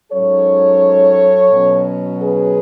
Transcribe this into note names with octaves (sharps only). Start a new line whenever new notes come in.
G#2 F#3 C#4 A4 C#5
B2 F#3 C#4
G#4 B4